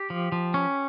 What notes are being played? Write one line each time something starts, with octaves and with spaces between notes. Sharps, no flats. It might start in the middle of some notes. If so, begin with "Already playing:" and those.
Already playing: G4
F3
F3
C#4